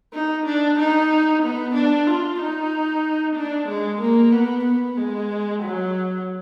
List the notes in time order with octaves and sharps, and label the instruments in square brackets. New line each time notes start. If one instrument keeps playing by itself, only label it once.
[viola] D#4
D4
D#4
B3
D4
F4
D#4
D4
G#3
A#3
B3
B3
G#3
F#3